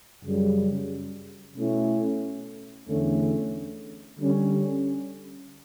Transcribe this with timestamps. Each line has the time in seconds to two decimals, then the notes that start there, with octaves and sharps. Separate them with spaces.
0.24 F#2 C#3 G3
1.57 B2 A3 C#4 E4
2.88 E2 D3 A3 C#4
4.19 D3 G3 C#4